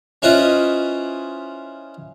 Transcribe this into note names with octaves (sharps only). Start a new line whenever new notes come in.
C#4 E4 F4 B4 C5 D#5